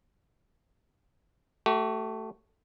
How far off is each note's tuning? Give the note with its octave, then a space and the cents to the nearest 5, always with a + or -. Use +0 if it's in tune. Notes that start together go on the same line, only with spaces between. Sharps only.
A3 +5 G4 -45